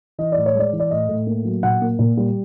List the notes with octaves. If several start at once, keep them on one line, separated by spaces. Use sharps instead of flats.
E3 D#5
A2 D5
C#5
G#3 D5
E3
D5
A2 D#5
A2
A#3
F#3
A#2 F#5
A#3
A#2
G3